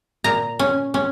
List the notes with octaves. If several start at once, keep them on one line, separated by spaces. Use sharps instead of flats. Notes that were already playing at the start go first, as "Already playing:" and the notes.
A#2 A#5
C#4
C#4